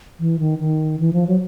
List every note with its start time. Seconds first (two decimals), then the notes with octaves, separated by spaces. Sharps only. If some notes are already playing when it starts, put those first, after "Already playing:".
0.20 E3
0.39 D#3
0.59 D#3
0.99 E3
1.13 F3
1.27 F#3